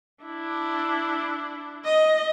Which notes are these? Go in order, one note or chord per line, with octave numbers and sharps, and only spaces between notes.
D4 E4
D#5